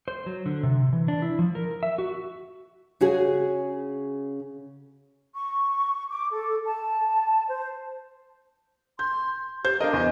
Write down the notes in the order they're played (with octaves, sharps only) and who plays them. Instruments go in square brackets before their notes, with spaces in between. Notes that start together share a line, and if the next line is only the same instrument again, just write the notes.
[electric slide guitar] C5
F#3
D3
C3
E3
D4
E4
F3
A#4
E5
F#4
[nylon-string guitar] C#3 F#4 G#4
[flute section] C#6
D6
A4
A5
C5
[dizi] C6 [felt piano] G6
[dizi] G4 [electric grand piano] C5 [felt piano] G6
[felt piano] D4 A#4 [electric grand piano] D#5 [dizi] F5
[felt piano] E2 [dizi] G#5